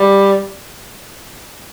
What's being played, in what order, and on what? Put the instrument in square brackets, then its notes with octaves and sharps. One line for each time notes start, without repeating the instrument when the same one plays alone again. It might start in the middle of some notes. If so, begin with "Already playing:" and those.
Already playing: [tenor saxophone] G3